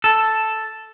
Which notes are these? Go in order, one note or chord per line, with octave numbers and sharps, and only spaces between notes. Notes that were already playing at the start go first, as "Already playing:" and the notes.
A4